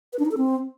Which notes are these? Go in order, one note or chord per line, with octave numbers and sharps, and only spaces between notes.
B4
D4
D#4
A4
C4